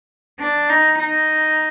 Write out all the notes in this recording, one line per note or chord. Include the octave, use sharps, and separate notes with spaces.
D4
D#4
D#4